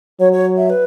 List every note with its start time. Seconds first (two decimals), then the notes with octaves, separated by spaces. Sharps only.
0.20 F#3 C#5
0.33 C#5
0.57 E5
0.70 B4